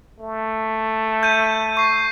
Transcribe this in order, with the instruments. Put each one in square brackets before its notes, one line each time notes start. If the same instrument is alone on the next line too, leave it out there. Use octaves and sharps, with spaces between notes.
[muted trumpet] A3
[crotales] G6 D#7
C#6 C7